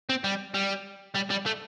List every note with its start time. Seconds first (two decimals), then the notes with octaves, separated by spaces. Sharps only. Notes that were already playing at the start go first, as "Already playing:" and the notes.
0.09 C4
0.24 G3
0.54 G3
1.15 G3
1.30 G3
1.46 A3